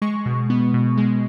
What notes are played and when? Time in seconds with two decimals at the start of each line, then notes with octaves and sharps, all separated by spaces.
0.02 G#3 C#6
0.26 B2
0.50 B3
0.74 B2
0.97 G#3